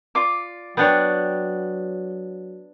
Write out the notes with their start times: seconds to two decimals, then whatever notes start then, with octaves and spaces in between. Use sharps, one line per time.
0.15 F4 D5 D6
0.77 F#3 B3 D4 C#5 F#5 G5